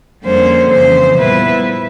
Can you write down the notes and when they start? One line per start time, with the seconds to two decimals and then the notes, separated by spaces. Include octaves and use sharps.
0.24 F2 D3 G3 A#3 C#4 C5
0.70 F2 C#3 E3 C5
1.17 A#2 G3 B3 E4 B4